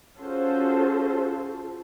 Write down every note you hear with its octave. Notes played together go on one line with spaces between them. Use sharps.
C#4 F4 F#4 G#4 A4 C5